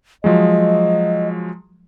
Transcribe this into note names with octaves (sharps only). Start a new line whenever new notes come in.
F3 F#3 G#3 D#5